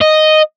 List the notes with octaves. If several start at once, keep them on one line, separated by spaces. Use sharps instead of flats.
D#5